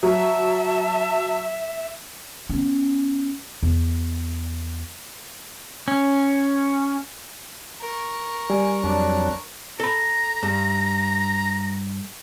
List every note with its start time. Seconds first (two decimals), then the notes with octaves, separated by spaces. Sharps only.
0.03 F#3 E5 A5
2.49 B3 C#4
3.63 E2
5.88 C#4
7.80 A#4 C#6
8.50 G3 G#5
8.83 F2 F#3 D4
9.80 A4 A#5 B5
10.43 G2